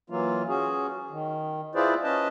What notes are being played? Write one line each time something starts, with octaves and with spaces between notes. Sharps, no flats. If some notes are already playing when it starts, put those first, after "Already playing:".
E3 F#3 A#3 F4
C#4 F#4 G#4
D#3
E4 F4 G#4 B4 C5 D5
C#4 B4 D#5 A5